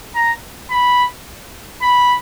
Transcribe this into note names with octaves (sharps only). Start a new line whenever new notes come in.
A#5
B5
B5